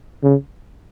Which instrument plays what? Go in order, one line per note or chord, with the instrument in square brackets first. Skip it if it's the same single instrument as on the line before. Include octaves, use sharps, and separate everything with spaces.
[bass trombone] C#3